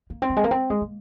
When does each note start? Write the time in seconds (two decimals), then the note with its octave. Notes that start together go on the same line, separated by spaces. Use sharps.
0.10 A#3
0.22 C4
0.30 F#3
0.37 G#3
0.44 A#3
0.51 C4
0.70 G#3
0.81 A#3